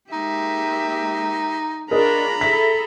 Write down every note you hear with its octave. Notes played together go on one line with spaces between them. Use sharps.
G#3 A#3 D#4 G4 E5
D4 F4 G#4 A#4 C#5 D#5 A#5 B5
E4 G#4 A4 E5 B6